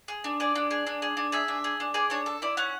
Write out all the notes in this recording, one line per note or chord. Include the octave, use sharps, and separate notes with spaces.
G#4
D4
G#4 D5
D4
G#4
D4
G#4
D4
G#4 E5
D4
G#4
D4
G#4 D5
D4 C#5
A4
E4 D5
C#4 F#5